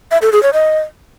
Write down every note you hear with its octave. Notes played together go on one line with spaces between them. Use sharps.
E5
A4
G#4
C#5
D#5